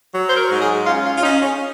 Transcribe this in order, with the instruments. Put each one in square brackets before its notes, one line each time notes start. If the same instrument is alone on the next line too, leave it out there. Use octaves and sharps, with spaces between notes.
[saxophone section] F#3
C5
A#4
G#2
G#4
C#4 F4
F4
F4
C#4 D#4
C#4